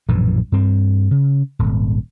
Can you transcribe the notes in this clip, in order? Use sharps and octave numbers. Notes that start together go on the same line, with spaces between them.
A#1 F#2 A2 E3
G2 C4
C#3
D#1 G#1